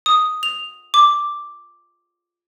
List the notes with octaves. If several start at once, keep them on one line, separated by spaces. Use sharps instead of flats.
D#6
F7
D6